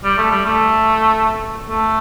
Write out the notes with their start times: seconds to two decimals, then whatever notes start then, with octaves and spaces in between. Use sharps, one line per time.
0.04 G3
0.18 A3
0.31 G3
0.45 A3
1.69 A3